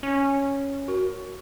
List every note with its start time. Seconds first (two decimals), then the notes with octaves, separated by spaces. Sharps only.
0.03 C#4
0.88 F#4 A#4